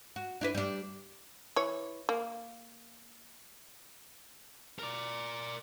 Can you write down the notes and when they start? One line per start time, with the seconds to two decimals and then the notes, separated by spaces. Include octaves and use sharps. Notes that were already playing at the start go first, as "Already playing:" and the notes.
0.16 F#4
0.41 D4 E4 B4
0.55 G3 D4
1.56 E3 C#5
2.09 A#3
4.79 A#4 D5